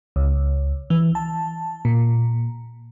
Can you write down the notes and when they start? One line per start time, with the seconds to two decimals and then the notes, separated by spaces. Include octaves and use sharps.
0.16 C#2
0.90 E3
1.15 A5
1.85 A#2